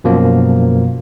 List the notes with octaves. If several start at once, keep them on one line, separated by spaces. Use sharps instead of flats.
F#2 B2 F3 A#3